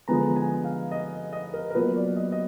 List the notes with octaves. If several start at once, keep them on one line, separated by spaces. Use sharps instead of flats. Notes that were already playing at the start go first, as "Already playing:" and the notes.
D3 F3 G#3 B3 A#5
G#5
F5
D#5
D#5
A#4
A#4
B2 F#3 A#3 F4 B4
D5
D#5
D#5